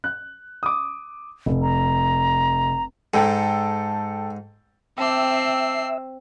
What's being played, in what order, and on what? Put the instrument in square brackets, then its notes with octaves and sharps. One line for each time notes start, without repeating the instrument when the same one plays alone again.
[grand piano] F#6
D6 D#6
F1
[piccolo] A#5
[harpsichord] G#2 [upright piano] A4 G5 A5
[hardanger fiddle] C4 [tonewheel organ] E5 [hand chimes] G5 A5 D6 [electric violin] E6 C7